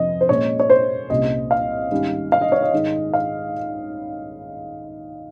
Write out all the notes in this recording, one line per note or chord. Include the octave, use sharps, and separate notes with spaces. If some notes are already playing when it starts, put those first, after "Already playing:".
Already playing: F2 C3 F3 C4 D#5
C5
A#2 G#3 C#4 C#5
C#5
C5
C2 A#2 G3 C#4 D#5
F5
G#2 D#3 G3 C#4
F5
D#5
C#5
D#5
G#2 D#3 G#3
F5